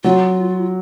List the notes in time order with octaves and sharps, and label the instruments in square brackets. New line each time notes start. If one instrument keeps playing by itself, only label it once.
[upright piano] F#3 [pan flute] F4